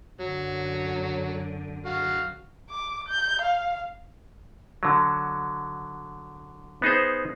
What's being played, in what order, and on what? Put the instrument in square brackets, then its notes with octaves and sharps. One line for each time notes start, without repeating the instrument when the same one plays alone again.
[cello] F#2 D3 [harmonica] F#3
[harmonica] F#4 F5
[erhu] D6
G6
F5
[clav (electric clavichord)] D3 F#3
B3 D#4 G#4 C5